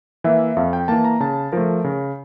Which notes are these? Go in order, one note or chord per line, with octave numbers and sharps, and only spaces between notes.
E3 A#3 E5
F2 F5
G5
E3 A#3 A5
A#5
C#3 A5
F3 A3 A#4
C#3